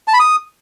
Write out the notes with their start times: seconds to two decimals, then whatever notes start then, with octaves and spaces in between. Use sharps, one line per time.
0.08 A5
0.14 B5
0.20 D#6